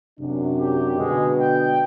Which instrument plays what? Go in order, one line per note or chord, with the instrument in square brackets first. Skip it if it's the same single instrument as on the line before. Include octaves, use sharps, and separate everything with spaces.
[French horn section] F#2 C3 D4
[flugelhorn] G4
[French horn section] B2 D3 B3 [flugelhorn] G#3
[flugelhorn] G5